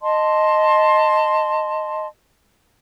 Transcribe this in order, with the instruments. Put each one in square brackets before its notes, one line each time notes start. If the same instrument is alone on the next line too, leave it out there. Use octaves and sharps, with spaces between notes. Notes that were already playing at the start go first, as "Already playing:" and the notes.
[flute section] D#5 A5 C6